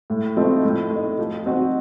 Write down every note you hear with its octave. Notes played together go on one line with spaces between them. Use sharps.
A2
F3 A3 C4 D#4
A2
A3
D#4
F3
C4 D#4 F#4